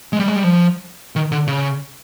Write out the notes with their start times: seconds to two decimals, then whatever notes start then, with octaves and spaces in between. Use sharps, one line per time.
0.13 G#3
0.20 G3
0.28 G#3
0.36 G3
0.44 F3
1.16 D#3
1.32 D3
1.47 C#3